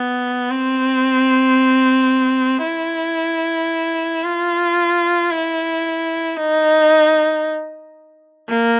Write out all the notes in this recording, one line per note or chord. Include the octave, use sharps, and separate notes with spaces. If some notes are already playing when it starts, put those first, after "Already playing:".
Already playing: B3
C4
E4
F4
E4
D#4
A#3